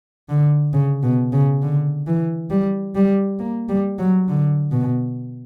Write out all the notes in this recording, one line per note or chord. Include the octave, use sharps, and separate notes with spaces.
D3
C#3
B2
C#3
D3
E3
G3
G3
A#3
G3
F#3
D3
B2